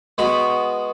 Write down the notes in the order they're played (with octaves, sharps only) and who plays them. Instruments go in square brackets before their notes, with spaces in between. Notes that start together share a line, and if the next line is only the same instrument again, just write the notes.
[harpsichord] G#3 B3 F#4 B5